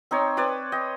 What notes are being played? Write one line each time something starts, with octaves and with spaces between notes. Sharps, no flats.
C4 D#4 C#5
C4 B4 C#5 D5
D#5 G5